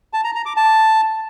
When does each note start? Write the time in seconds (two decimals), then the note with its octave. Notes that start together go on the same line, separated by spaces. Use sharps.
0.13 A5
0.24 A#5
0.35 A#5
0.46 D6
0.56 A5